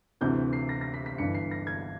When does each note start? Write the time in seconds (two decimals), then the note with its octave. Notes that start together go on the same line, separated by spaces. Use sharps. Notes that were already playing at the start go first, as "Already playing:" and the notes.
0.21 D2 C3 E3 G6
0.53 C7
0.69 A#6
0.81 A#6
0.94 B6
1.06 B6
1.18 G1 G2 E3 C#7
1.34 C7
1.51 A#6
1.67 G#6